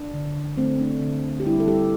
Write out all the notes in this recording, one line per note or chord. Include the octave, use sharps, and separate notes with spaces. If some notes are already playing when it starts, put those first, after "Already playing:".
Already playing: D4
D3
D3
A3 C4
A3 D4
D3
D3
G4
G3 E4
A4
G3 G4